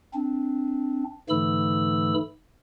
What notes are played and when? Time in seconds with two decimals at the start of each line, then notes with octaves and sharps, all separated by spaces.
0.14 C4 D4
1.29 G#2 D3 E3 A3 B5 E6